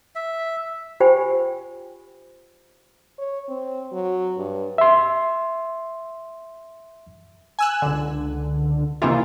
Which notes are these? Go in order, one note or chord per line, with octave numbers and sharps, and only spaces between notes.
E5
F4 G4 C5 G5 G#5
C#5
C4
F#3
G2
E5 C6
G#5 E6 F#6
C#2 D3
C3 D#3 E3 A#3 E4 F4